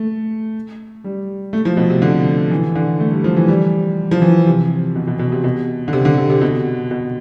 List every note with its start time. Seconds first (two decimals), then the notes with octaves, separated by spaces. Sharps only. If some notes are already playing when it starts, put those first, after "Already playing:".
Already playing: A3
1.04 G3
1.53 A3
1.65 F3
1.77 B2
1.90 C3
2.02 D3
2.51 E3
2.75 D3
3.00 A3
3.12 G3
3.24 F3
3.37 E3
3.48 G3
4.11 F3
4.22 E3
4.46 C3
4.95 B2
5.07 B2
5.19 B2
5.32 C3
5.44 B2
5.88 D3
5.93 C3
6.05 D3
6.18 C3
6.30 C3
6.41 B2
6.91 B2